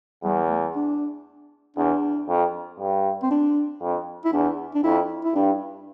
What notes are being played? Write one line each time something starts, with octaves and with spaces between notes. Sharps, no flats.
E2 G3
A3
D4
E2 D4
F2
G2
C4
D4
F2
E4
E2 D4
D4
F2 E4
E4
G2 D4